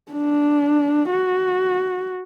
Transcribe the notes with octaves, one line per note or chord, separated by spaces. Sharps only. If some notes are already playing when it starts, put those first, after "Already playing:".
D4
F#4